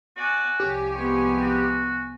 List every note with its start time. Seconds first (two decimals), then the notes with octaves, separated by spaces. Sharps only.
0.17 F#4 D5 G#5
0.60 C2 F3 G4 C#5 G#5
0.95 G#3 B3 C#5
1.42 F#4